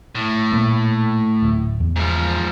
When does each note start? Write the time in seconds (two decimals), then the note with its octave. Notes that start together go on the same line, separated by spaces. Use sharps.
0.15 A2
0.52 A#2 A3 A#3
1.42 D1
1.80 E2
1.96 G#2 F3